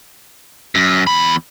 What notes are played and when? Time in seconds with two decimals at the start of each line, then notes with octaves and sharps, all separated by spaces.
0.75 F#2
1.07 E2 B5